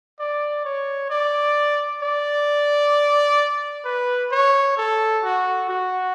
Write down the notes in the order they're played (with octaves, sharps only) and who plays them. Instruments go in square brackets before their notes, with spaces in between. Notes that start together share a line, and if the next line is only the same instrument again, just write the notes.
[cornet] D5
C#5
D5
D5
B4
C#5
A4
F#4
F#4